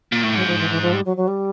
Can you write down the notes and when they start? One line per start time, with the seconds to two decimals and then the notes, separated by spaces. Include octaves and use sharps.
0.12 A#2
0.24 A2
0.35 G#2 F#3
0.47 F3
0.59 E3
0.70 E3
0.82 F3
0.93 G3
1.05 F#3
1.17 F#3
1.28 G3